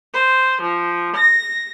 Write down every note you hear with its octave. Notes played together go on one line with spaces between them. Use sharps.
C5
F3
A#6